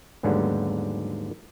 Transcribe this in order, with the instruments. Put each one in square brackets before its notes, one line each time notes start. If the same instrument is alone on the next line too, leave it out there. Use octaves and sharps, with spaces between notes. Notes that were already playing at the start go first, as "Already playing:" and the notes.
[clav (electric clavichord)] D#2 G#2 D3 F#3 G3 B3